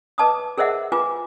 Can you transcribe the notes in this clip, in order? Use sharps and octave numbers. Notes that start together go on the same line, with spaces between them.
B4 D#5 A5 D6 D#6
G#4 A#4 C5 D#5 E5 F#5
F4 B4 G#5 D6